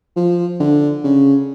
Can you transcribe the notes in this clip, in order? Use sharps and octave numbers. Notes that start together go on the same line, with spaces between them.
F3
D3
C#3